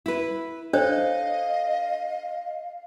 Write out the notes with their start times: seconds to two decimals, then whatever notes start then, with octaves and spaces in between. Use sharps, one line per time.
0.06 E4 B4
0.73 D4 A4 C5 C#5 D#5 F5